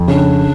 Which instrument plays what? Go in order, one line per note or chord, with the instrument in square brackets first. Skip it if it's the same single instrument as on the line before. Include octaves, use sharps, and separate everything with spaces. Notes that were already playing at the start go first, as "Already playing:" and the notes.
Already playing: [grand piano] F2
[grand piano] C#3 [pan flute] D4